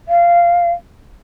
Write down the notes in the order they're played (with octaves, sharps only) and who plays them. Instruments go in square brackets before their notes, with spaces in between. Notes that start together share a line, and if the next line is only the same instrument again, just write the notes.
[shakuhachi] F5